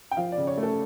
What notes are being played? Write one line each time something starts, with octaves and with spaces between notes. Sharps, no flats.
G5
F3 F5
D5
C#3
C#5
A3
A4